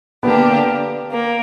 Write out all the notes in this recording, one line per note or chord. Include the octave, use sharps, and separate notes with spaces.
D3 A#3 B3 D4 G4
A#3